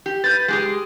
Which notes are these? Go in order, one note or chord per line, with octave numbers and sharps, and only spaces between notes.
G4
B4 G6 A6
G#3 G4 G#4